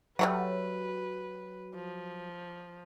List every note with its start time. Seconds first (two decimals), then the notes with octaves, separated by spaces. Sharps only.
0.19 F#3 G3 A3 B4 F#5
1.74 F3